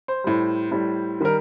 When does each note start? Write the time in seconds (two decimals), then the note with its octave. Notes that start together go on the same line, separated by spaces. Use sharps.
0.08 C5
0.24 A2 G3
0.71 A2 G3
1.20 D#3 G3 A#4